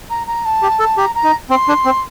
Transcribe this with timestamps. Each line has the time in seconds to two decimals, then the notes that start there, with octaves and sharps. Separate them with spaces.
0.10 A#5
0.27 A#5
0.45 A5
0.62 G4
0.79 A4
0.97 G4 A#5
1.15 A#5
1.24 D#4
1.50 C4 C6
1.68 D4
1.85 C4